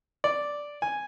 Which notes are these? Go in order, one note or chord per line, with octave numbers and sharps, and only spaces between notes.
D5
G#5